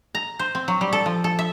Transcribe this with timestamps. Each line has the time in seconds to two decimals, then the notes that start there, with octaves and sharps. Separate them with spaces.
0.15 A#5
0.39 C5
0.55 C4
0.68 F#3
0.81 G3
0.93 A4
1.06 F3
1.24 A4
1.39 E5